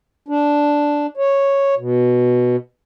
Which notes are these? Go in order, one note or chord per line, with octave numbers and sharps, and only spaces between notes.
D4
C#5
B2